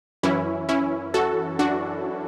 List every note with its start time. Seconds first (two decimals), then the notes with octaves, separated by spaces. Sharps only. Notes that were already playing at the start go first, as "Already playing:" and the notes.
0.23 F#2 E3 C#4 E4
0.69 C#4 E4
1.14 F#4 A4
1.59 D4 F#4